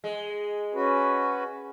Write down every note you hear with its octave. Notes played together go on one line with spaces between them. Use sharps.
G#3
C#4 F#4 B4